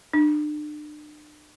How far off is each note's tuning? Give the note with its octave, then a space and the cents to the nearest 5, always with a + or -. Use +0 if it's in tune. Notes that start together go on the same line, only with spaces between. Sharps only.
D4 +35